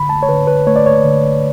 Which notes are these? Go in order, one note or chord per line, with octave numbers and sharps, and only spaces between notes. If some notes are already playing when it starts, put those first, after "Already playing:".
Already playing: D3 B5
A5
C#5
D3 B4
B4
A3 C#5
D5
C#5
D3